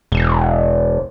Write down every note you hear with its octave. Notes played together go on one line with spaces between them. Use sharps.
E1